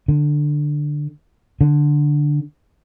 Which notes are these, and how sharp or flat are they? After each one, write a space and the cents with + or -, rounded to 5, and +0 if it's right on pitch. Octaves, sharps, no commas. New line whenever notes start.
D3 +10
D3 +0